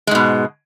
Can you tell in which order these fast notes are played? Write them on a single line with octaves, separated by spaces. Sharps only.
G#3 G#2 B2